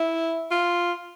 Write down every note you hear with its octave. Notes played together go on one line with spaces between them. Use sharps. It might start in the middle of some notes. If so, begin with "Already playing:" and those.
Already playing: E4
F4